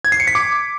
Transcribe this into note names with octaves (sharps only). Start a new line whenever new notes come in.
G#6
C7
C#7
B6
D6